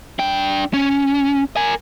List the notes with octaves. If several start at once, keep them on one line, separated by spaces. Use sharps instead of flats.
D4 G5
C#4
A#4 G#5